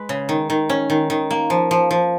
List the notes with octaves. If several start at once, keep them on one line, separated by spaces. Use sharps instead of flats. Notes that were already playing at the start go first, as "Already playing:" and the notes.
Already playing: G#3 B4
C#3
D#3
D#3
C#4
D#3
D#3
A#3
F3
F3
F3